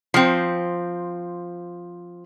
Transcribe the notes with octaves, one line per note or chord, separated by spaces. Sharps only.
F3 C4